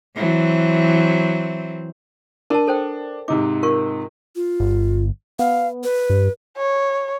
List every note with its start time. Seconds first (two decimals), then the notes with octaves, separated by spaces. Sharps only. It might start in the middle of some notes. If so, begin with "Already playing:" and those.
0.16 E3 F#3 C4
2.50 D4 A#4 A5
2.67 A4 C5 G5
3.28 G#2 C3 D#4 D6
3.63 F4 A#4 C#6
4.36 F4
4.60 G1
5.39 B3 F5
5.84 B4
6.10 G2
6.57 C#5